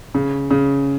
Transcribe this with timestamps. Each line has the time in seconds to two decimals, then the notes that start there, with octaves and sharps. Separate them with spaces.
0.15 C#3
0.51 C#3